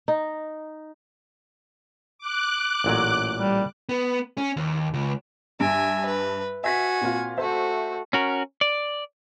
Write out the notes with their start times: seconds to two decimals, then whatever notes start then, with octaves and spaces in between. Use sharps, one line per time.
0.08 D#4
2.19 D6 F#6
2.84 A1 A#2 F#3
3.38 G3
3.89 B3
4.37 C#4
4.57 D#2
4.94 C#2
5.60 G2 E5 G#5 D7
6.06 B4
6.64 F#4 E5 G#5 B6
7.01 A#2 C4 F4
7.38 A3 F#4 C5 E5
8.13 C#4 F#4 A#4
8.61 D5